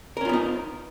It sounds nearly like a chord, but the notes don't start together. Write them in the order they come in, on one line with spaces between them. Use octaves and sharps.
A#4 C#4 F4 B3 D#4